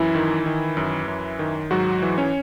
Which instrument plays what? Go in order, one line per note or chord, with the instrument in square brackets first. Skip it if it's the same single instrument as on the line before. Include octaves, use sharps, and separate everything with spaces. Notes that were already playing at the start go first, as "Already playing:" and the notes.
Already playing: [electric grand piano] F#2 E3 E4
D#3
D#3
F#2
F#2
D#3
G#2 F#3 F#4
E3
C#4 C#5